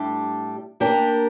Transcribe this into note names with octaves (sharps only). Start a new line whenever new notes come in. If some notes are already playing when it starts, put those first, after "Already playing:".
Already playing: A2 G3 D4 G4
A#3 D4 G4 A#4